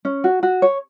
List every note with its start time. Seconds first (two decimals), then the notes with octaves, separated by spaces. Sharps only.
0.05 C#4
0.24 F#4
0.43 F#4
0.62 C#5